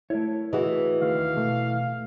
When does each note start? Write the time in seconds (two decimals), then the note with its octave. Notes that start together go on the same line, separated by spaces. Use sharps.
0.10 A3 E4 A#4 C#5
0.53 E3 B3 F#4 G#4 D#5
1.02 D#2 D#3 F5
1.37 B2 A3